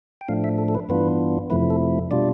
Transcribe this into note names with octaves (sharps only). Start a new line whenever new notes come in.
G5
A2 F3 A3 D4 F5
E5
A4
A4
B4
G2 E3 B3 D4 F4 B4
F2 C3 F3 A3 E4 B4
A4
B2 G3 D4 F4 D5